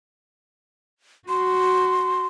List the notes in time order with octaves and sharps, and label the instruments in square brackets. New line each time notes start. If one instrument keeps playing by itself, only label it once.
[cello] F#4 [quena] C6